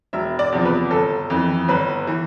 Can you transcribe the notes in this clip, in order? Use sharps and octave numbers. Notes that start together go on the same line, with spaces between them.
E1 E5
D5
E2 C3 F3
B4
G1 A4
F2 E3
G1 B4
E3